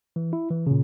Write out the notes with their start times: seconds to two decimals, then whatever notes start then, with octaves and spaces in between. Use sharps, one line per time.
0.16 E3
0.33 E4
0.51 E3
0.67 A#2 C#3